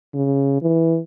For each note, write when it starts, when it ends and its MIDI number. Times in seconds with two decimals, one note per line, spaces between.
0.14 0.60 49
0.62 0.99 52